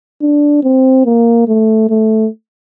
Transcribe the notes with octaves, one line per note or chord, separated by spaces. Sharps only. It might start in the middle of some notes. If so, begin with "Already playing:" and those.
D4
C4
A#3
A3
A3